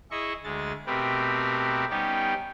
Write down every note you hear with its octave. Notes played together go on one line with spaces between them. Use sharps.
E4 G#4 D#5 E5 C#6
D2 G#3 A6
B2 A3 C4 G4 A#4 B4
G3 B3 C#4 D#4 G4